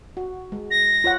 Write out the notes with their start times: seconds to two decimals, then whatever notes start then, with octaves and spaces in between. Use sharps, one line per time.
0.17 F#4
0.52 G#3
0.71 A#6
1.04 F4 C#5 F#5